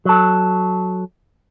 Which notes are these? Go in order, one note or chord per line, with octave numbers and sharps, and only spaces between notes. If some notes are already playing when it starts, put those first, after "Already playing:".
F#3 A4